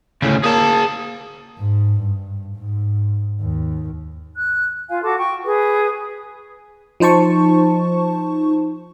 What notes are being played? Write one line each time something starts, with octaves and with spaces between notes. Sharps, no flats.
D2 A2 C#3
A#3 G#4 A5
G#2
G2
G#2
D#2
F#6
F4 F5 G#5
F#4 A4 A5 D6
G5 C#6
G#4 B4
F3 D#4 C5 A5 C#6